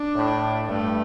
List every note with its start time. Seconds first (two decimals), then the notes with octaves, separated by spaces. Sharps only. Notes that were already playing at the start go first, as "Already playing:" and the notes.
Already playing: D4
0.15 A2
0.68 G2 A3